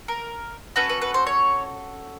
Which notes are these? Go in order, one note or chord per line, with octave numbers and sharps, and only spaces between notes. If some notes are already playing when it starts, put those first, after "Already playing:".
A#4
C#4 F#4 A4 B4
B4
B4
C5
C#5